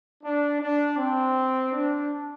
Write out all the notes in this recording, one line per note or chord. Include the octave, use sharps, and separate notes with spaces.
D4
D4
C4
D4